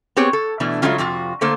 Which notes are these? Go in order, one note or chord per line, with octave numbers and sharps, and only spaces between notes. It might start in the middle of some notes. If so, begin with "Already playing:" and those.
B3 C4 G4 G#4 C#5
A4
B2 E3 A3 D4
C#3 F#3 G#3 A3 C#4 F4
F2 C3 F4 F#4
D3 A3 A#3 A4 C5